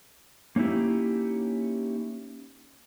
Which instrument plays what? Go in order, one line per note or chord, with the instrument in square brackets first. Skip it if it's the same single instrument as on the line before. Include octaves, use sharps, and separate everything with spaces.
[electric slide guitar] A#3 C#4 D#4 E4 G4